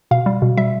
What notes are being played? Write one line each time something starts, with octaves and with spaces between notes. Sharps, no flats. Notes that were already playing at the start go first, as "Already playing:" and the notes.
B2 F5
G3
B2
G3 E5